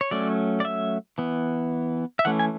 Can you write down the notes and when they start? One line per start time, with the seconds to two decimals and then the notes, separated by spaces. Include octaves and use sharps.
0.01 C#5
0.11 F#3 A3 C#4 D5
0.60 D5
0.65 E5
1.18 E3 B3
2.19 E5
2.25 E3 A3 C#4 F#5
2.39 G#5